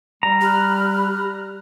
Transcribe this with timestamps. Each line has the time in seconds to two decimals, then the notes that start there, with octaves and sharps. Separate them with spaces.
0.23 G3 A#5
0.41 G4 B5 F6 F#6